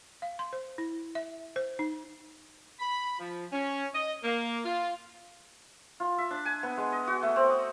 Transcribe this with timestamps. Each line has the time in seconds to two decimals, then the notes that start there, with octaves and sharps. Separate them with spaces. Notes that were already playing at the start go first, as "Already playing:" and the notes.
0.22 F5
0.39 C6
0.53 C5
0.78 E4
1.15 E5
1.56 C5
1.79 D#4
2.80 B5
3.19 F3
3.52 C#4
3.94 D#5
4.24 A#3
4.65 F4
6.00 F4
6.18 E5
6.31 D4
6.45 G#5
6.63 B3
6.77 G#3
6.92 D#5
7.07 F#4
7.23 A3
7.36 C4
7.50 D#6